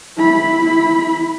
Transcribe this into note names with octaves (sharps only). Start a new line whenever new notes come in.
E4 B5